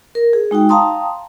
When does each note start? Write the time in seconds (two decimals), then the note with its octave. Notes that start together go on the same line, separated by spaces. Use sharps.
0.15 A#4
0.33 G#4
0.51 G#3 D#4 F#4 G5
0.69 F5 G5 A5 A#5 C6 D#6